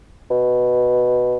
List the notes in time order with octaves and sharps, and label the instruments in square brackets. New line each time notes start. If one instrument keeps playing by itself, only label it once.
[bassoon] B2